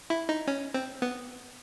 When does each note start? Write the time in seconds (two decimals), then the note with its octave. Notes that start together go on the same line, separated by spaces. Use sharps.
0.10 E4
0.29 D#4
0.47 C#4
0.74 C4
1.02 B3